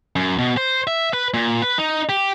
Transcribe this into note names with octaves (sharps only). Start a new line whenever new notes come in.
F#2
B2
C5
E5
B4
A#2
B4
D#4
G4